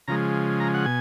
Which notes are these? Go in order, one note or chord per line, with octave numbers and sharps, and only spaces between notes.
C#3 F3 G#3 A#5
A#5
F#5
B2 G#5